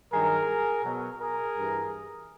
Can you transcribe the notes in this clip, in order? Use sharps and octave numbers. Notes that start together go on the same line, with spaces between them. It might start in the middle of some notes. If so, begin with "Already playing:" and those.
G2 D#3 F#3 G#4 A#4
B2 F#3
G#4 A#4
G2 E3